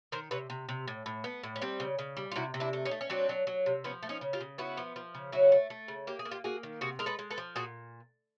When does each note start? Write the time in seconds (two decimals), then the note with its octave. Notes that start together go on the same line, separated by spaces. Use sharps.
0.12 D#3 A#4 C5
0.31 C3 B4 C#5
0.50 C3
0.69 C3
0.88 A2
1.06 A2
1.24 B3
1.43 A2
1.56 C#4
1.61 G3 C4
1.80 C#3
1.99 C#3
2.17 G3
2.32 F4
2.36 C3 E4 F#4
2.54 C3
2.60 D4 E4
2.73 A3
2.85 C#4 D#4
2.91 A3
3.01 C#4
3.10 F#3 C4 D4
3.29 F#3
3.47 F#3
3.66 C3
3.84 F3 B3 C#4
4.03 A3
4.09 C#4 D#4
4.21 C#3
4.33 F4 G4
4.41 C#3
4.58 B3 E4 F#4
4.77 F3
4.96 F3
5.15 C#3
5.32 F#3 E4 F#4
5.52 A3
5.70 A3
5.88 C#3
6.07 A#3 G4
6.19 G#4
6.25 A#3
6.31 F4 G4
6.44 A#3 F#4 G#4
6.63 D#3
6.81 C3 F#4 G#4
6.99 G#3 A#4
7.06 A4 B4
7.19 G#3
7.31 A4 B4
7.38 F3
7.56 A#2 F#4 G#4